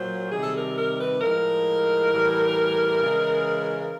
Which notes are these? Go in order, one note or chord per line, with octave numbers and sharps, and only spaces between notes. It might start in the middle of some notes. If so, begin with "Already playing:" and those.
Already playing: A#2 F#3 C5
C3 D#3 G3 G#4
A4
A#4
A#4
B4
A2 F3 G#3 A#4
A2 E3 G3
C#3 E3 G#3